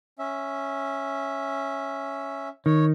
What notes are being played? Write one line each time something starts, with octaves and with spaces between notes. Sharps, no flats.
C#4 E5
D#3 C#5